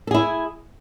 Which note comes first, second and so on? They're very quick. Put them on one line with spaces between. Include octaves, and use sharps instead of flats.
A4 G#4 E4